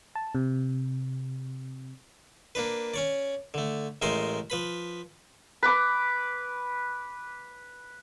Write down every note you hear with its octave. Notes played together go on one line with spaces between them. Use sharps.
A5
C3
A#3 D4 B4
C#4 C#5 D5
D3 A3
A1 G#3 A3 A#4 C5 G#5
F3 B4 B5
B4 D6